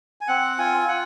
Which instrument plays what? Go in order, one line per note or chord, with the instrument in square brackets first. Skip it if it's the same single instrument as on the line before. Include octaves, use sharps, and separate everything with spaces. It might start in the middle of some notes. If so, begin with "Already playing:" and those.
[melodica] G#5
C4 F#5
F4 G#5
F4 F#5